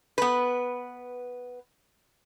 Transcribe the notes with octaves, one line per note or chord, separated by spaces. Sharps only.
B3 B4